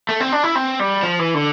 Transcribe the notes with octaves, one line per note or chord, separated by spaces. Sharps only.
A3
C4
D4
E4
C4
G3
F3
E3
D3